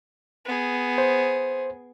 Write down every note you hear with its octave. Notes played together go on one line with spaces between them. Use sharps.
B3 G#4
C5